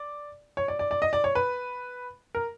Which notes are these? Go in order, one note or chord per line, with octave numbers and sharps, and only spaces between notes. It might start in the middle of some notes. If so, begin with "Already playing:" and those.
Already playing: D5
C#5
D5
D5
D5
D#5
D5
C#5
B4
A#4